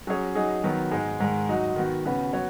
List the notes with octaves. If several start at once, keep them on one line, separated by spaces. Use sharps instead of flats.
F#3 C#4 G#4 C#5
F#3 D#4 G#4
D#3 F#3 B3
G#2 G#3 D#4
G#2 D#3 G#3
F#3 D#4 F#4
D#3 B3 F#4
C#3 B3 F#4 B4
F#3 B3 F#4 C#5